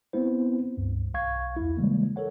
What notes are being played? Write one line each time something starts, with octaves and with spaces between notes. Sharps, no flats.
B3 C4 E4 C5
C#2 G2
B1 F5 C#6 G#6
E2 E4
C#3 E3 G3 G#3 A#3
A4 A#4 C#5 F#5